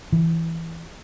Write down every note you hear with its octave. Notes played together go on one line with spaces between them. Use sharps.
E3